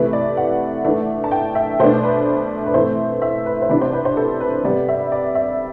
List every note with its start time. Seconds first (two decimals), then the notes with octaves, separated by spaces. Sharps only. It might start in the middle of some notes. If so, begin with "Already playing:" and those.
Already playing: C3 E3 A3 B4
0.13 D5
0.37 F#5
0.84 E3 A3 D4
1.24 A5
1.31 G5
1.55 E5
1.79 B2 A3 D4 C5
2.03 B4
2.66 B4
2.74 E3 A3 C4 C5
3.22 E5
3.46 B4
3.62 C5
3.69 C3 E3 B3 D4 B4
3.81 C5
3.93 B4
4.05 C5
4.17 A4
4.40 B4
4.64 C3 G3 B3 D5
4.88 E5
5.12 D5
5.35 E5